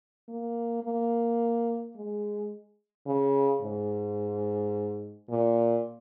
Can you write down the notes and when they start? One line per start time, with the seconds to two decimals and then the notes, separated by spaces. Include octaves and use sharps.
0.29 A#3
0.84 A#3
1.96 G#3
3.07 C#3
3.62 G#2
5.30 A#2